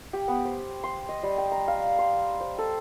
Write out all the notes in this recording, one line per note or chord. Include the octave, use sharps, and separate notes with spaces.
G4
B3
C5
C6
D#5
G3
G5
A#5
F5
C6
C5
A4